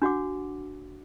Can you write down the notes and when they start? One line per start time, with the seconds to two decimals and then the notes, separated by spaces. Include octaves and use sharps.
0.02 D4 F#4 F#5 D6